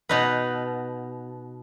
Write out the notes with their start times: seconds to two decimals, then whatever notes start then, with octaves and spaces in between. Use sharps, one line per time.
0.09 B2 D#4 B4